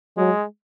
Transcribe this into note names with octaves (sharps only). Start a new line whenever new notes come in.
F#3 G#3